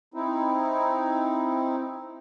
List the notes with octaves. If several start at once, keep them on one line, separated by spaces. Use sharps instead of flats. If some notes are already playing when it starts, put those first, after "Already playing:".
C4 D#4 E4